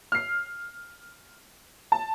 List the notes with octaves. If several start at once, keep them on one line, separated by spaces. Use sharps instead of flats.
F6 C7
A5